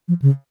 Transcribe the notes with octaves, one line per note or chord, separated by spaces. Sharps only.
F3
C#3